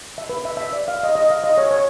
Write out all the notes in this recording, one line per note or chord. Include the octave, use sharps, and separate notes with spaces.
E5
B4
E5
E5
D5
F5
D#5
D#5
F5
D#5
C#5
C#5